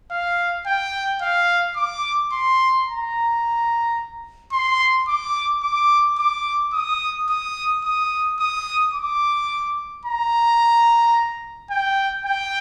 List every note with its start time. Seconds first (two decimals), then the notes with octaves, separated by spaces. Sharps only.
0.11 F5
0.66 G5
1.22 F5
1.76 D6
2.32 C6
2.87 A#5
4.53 C6
5.08 D6
5.63 D6
6.18 D6
6.74 D#6
7.29 D#6
7.84 D#6
8.40 D#6
8.94 D6
10.05 A#5
11.70 G5
12.25 G5